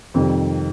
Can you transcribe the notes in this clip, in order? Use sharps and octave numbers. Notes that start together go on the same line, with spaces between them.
F2 C3 D#3 G3